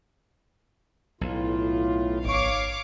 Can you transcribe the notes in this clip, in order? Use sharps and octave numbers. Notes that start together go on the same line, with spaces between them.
B1 A2 F4
G#1 C#5 F5 C#6 D6